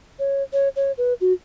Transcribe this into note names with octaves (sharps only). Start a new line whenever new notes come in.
C#5
C#5
C#5
B4
F#4